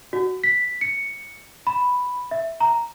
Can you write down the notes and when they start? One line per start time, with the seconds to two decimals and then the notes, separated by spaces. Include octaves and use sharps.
0.13 F#4
0.44 B6
0.81 C#7
1.67 B5
2.31 E5
2.60 A#5